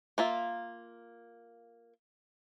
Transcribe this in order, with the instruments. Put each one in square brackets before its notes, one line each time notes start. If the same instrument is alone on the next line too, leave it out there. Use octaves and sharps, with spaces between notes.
[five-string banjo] A#3 F4 E5